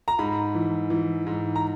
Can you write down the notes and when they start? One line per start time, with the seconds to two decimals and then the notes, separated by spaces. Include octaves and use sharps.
0.08 A#5
0.19 G#2 B5
0.55 E3
0.90 E3
1.27 G#2
1.56 A#5